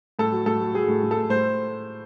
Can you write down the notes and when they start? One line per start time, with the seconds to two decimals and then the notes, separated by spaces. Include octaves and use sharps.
0.19 A2 A4
0.32 F#3
0.46 A2 A4
0.61 F#3
0.74 F#3 G#4
0.88 A2
1.03 A2
1.11 A4
1.17 A3
1.30 A2 C5